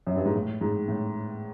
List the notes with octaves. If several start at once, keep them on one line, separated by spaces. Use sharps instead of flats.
F#2
G2
G#2
A2
G#2
A2